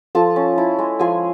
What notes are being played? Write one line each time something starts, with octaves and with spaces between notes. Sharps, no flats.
F3 A4 A5
C#4
E4
G#3
F3 G#4 G#5